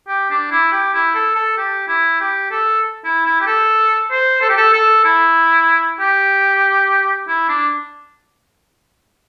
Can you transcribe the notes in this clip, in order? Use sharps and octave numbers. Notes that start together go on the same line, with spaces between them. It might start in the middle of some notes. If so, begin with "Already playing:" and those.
G4
D4
E4
G4
E4
A4
A4
G4
E4
G4
A4
E4
E4
G4
A4
C5
A4
G4
A4
A4
E4
G4
E4
D4